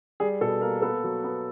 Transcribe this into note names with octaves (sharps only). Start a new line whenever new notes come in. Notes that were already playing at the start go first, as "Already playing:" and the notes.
G3 G#4
B2 A4
A#3 A#4
B3 A4
F#3
B3